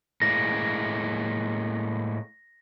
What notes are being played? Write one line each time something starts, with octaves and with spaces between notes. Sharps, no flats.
A2 G#3 A#3 A#6